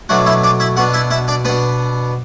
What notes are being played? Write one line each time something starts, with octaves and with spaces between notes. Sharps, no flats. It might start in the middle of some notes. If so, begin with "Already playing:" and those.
B2 F#3 A3 D4 F#4 F#5
E4 E5
D4 D5
E4 E5
B2 B3 D4 F#4 F#5
E4 E5
E4 E5
D4 D5
B2 B3 D4 B4